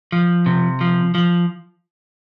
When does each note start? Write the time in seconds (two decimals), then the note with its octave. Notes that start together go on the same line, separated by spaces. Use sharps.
0.12 F3
0.46 C3
0.81 F3
1.15 F3